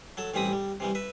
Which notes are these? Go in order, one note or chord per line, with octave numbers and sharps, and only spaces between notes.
F#3 A4 A5
A1 E3 G3 C4 B5 D#6
G3
C3 E3 G3
B4 E5